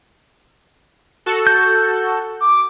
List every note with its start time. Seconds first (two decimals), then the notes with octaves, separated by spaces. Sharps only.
1.26 F#4 A4
1.47 G6
2.41 D6